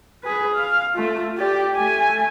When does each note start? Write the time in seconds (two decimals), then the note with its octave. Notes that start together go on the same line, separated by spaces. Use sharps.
0.24 G#4 B4
0.54 F5
0.94 A3 F4
1.37 G4 D5
1.75 A3 G#5